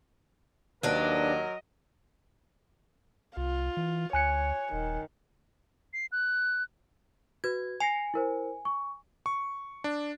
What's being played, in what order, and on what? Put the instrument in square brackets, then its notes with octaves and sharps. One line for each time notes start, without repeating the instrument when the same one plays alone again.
[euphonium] D#2 [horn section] F#3 A#4 [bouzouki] D4 B4 [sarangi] D#5
[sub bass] C2 [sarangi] F4
[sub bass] E3
[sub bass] D2 [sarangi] C#5 [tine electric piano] G#5 F#6 C#7
[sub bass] D#1 [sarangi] D#3
[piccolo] C7
F#6
[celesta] F#4 B4 [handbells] G#6
[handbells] G#5 [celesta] A#6 C7 F7
[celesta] E4 A#4 C5
C#6
[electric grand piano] C#6
D4